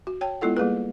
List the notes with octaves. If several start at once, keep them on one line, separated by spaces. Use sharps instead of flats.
F#4
C#5 G5 A5
G#3 B3 E4 F4 A4 F#5
G3 A#3 G#4 B4